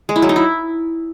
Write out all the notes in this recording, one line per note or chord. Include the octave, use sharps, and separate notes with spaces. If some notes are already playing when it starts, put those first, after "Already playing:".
G#3
E4
F#3
D#4
E4